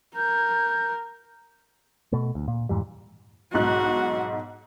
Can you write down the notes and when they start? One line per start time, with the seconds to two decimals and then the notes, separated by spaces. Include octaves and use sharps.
0.16 A#4 G6
2.12 B2 A3
2.35 D2
2.48 A#2
2.69 F2 G#2 E3 G3
3.54 B1 G#2 F#4 F#6